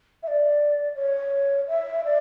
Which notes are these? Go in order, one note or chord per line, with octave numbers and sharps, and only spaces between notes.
E5
D5
C#5
E5
D5